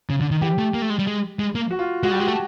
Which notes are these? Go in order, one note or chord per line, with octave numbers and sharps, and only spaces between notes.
C#3
D3
D#3
E3 G4
A3
A#3
A3
G#3
G3
G#3
G#3
A#3
F#4
F4
G#3 F#4
G3 G4
G#3
F#4
A3